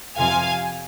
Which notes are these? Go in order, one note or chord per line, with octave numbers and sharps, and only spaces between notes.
F2 C3 F3 F5 G#5